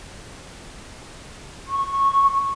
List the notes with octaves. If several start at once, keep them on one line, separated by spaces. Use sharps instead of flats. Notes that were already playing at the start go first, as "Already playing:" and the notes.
C#6